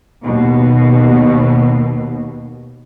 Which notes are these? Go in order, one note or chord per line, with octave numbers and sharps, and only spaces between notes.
D#2 B2